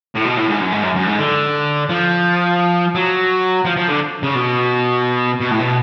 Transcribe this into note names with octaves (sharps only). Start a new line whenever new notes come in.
A2
B2
A2
G#2
F#2
G#2
F#2
F#2
G#2
D3
F3
F#3
F3
F3
D3
C#3
B2
B2
A2
B2